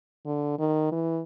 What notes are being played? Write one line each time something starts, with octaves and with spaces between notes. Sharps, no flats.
D3
D#3
E3